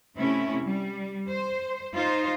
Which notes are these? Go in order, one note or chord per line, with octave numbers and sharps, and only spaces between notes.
C3 A3 C#4 E4
G3
C5
D#4 F4 C5